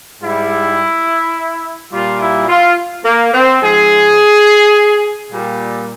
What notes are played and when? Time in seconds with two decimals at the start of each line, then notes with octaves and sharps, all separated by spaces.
0.22 G#2 G3 E4
1.92 A#2 G3 F4
2.20 E4
2.48 F4
3.05 A#3
3.34 C4
3.62 G#2 F3 G#3 G#4
5.32 A#2 G3